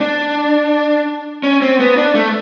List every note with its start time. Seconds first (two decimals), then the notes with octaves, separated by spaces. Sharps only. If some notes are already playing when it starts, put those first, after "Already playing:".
0.01 D4
1.43 C#4
1.62 C4
1.80 B3
1.97 D4
2.15 A3